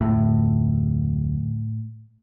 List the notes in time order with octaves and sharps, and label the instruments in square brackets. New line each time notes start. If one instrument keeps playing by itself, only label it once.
[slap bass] D1 F2 [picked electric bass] A2